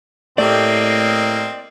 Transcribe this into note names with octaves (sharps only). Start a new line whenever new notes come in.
A2 A3 A#3 C4 G4 D5 D#5